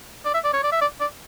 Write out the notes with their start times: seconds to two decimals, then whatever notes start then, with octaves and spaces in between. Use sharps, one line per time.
0.25 D5
0.34 E5
0.44 D5
0.53 C#5
0.63 D5
0.72 E5
0.81 D5
1.00 D5